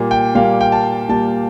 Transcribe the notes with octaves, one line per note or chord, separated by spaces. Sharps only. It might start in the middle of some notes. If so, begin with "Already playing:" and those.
Already playing: A#2 G3 A#3
G5
A#2 G3 A#3 F5
G5
A5
A#2 G3 A#3 A5